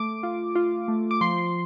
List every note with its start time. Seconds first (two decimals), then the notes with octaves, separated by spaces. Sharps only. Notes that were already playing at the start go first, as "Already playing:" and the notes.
Already playing: A3 D6
0.23 F4
0.55 F4
0.88 A3
1.11 D6
1.21 F3 C6